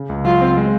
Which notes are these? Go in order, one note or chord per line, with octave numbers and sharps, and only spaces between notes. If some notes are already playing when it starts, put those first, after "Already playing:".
Already playing: C#3
C#2
F#3 F4
C4
G#3